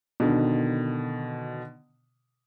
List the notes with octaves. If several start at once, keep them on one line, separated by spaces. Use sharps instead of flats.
B2 D3 D#3